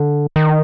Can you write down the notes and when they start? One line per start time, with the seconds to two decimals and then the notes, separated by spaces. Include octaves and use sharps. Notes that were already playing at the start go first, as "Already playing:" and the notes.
Already playing: D3
0.36 D#3